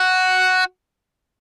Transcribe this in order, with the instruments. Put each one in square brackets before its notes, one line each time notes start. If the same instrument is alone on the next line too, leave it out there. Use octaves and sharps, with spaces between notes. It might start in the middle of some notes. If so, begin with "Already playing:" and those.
Already playing: [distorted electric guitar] F#4